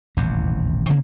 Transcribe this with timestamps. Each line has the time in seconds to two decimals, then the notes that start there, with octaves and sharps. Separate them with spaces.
0.17 D#1 A1 E2 C3
0.89 C3 D#3 A#3 C4